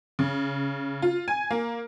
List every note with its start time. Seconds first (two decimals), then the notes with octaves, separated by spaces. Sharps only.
0.19 C#3
1.02 F4
1.28 G#5
1.51 A#3